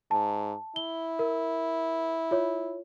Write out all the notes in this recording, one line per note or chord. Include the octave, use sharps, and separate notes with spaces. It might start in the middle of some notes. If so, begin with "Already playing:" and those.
G#2 A5
E4 G7
A#4
F4 C#5